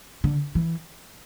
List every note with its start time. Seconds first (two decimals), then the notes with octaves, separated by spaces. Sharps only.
0.24 D3
0.55 E3